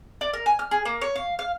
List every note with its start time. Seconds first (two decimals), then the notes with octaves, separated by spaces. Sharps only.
0.21 D5
0.33 A#4
0.46 G#5
0.59 F6
0.71 G#4
0.85 A#3
1.01 C#5
1.16 F5
1.39 F5